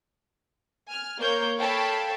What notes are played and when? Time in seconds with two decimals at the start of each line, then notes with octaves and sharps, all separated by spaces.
0.88 G#5 F6
1.18 A#3 A#4 C#5 G6
1.57 A4 C#5 F5 G5 A5 B5